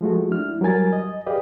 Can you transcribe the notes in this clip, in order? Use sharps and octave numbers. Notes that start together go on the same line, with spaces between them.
F3 G#3 A3 F#4
D4 E4 F6
F#3 G3 A#4 G#5 A6
D#5
G4 G#4 B4 D5 D#5 F5